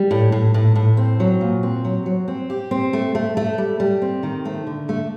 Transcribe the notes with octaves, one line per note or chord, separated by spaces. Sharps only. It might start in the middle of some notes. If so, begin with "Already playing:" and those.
Already playing: G3
A2
A2
A2
A2
C4
F#3
A#2
C4
F#3
F#3
C4
G4
C4
A3
A3
A3
G3
G3
C4
D#3
A3
D3
A3